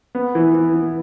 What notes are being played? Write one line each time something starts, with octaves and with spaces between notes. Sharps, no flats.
B3
E3
E3
B3